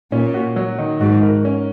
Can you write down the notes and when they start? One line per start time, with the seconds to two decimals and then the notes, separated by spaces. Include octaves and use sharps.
0.12 A#2 C#4
0.34 F#4
0.56 F#3
0.78 D#3
1.00 G#2 F#4
1.23 A#4
1.45 C#4